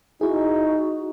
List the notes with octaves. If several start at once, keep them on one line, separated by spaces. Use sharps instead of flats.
D#4 E4 F#4 G#4